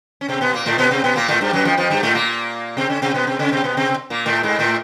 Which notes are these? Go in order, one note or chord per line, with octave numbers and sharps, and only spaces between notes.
C#4
C3 C4
B2 B3
A#2 A#3
A2 A3
B2 B3
C3 C4
B2 B3
A#2 A#3
A2 A3
G2 G3
F#2 F#3
F2 F3
F2 F3
G2 G3
A2 A3
A#2 A#3
C3 C4
C#3 C#4
C3 C4
B2 B3
C3 C4
C#3 C#4
C3 C4
B2 B3
C3 C4
A#2 A#3
A2 A3
G#2 G#3
A2 A3